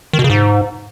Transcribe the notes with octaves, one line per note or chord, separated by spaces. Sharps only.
D#3
B2
C#3
G#2